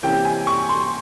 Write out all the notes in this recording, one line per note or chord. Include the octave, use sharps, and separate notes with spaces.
C3 E3 A#3 C#4 G5
G#5
C#6
C6